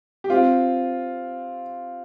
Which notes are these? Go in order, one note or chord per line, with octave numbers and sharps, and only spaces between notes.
G4
C4 F4